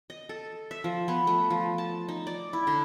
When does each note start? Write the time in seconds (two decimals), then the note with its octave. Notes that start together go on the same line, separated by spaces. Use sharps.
0.10 D#5
0.29 A4
0.71 E5
0.84 F3
1.08 B3
1.27 A3
1.50 F3
1.78 A5
2.09 D#4
2.27 D5
2.53 E4
2.67 D3